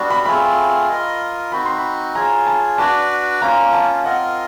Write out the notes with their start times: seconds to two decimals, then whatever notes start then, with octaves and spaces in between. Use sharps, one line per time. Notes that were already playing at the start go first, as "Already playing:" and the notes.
Already playing: G3 B3 D4 F#4
0.10 B5
0.25 A3 C4 F4 G#4 B5
0.89 F4 A#4 D#5
1.52 C4 D#4 F#4 B5
1.65 C6
1.78 B5
2.15 F4 G#4 C#5 A#5
2.47 A5
2.78 D4 F#4 B4 D5 A5
3.41 A#3 C#4 F4 A#5
3.73 A5
4.04 C4 F4 A#4 D#5 F#5